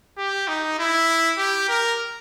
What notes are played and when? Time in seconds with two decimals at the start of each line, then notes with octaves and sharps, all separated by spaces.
0.18 G4
0.48 D#4
0.79 E4
1.38 G4
1.69 A#4